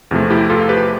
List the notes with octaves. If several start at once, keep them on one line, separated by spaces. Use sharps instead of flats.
E2 C3 F3 A3
E4 G4
F4 A4
G4 B4